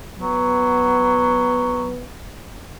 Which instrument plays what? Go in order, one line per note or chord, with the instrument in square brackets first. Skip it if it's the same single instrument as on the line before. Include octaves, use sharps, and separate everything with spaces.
[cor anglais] F#3 [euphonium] B3